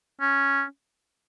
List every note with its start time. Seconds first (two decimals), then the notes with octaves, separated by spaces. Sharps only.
0.21 C#4